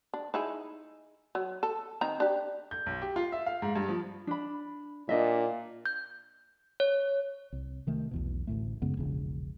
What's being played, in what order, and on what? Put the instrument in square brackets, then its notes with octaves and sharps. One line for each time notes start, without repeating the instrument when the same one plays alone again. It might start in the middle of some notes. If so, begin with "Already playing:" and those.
[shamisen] D4
D#4 E4 G#4
F#3
A4
D#3 C4 A#5
D4 G4
[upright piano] G6
B1
G4
F4
E5
F5
G#2
G2
F3
[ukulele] D4 B5
[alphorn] A#2 [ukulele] D4 D#5 E5
[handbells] G6
C#5
[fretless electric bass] C2
C3 D#3 A3
B1 E2 B2
A1 D2 A2 A3
F#2 C#3 G#3 B3
E1 A#1 C#3